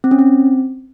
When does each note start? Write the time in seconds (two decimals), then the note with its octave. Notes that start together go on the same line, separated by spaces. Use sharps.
0.04 C4
0.11 C#4
0.19 C4